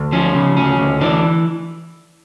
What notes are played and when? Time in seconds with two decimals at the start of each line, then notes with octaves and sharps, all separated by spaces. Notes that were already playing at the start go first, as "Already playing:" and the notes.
Already playing: D2
0.12 F3 C#4
0.34 C#3
0.57 D2 C#4
0.79 D2
1.01 E3 D4